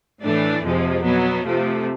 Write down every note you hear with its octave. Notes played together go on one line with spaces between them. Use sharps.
A2 E3 A3 D4
F2 C3 F3 G#3
B2 F#3 B3
C3 F3 A3